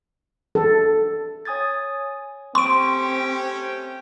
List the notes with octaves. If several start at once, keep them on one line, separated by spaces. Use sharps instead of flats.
A4
C#5 G#5 D#6 G#6 A6
A3 C4 C#4 G4 C6 C#6 D7